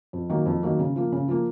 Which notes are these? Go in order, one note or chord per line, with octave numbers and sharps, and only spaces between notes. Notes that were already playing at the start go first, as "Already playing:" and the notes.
F2
D#3 F#3 A#3
F2
D#3 F#3 A#3
C#3
F3 A#3
C#3
F3 A#3